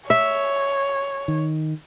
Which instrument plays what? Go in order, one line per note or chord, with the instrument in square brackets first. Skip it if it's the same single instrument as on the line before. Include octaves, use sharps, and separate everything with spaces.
[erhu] C#5 [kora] E5
[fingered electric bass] D#3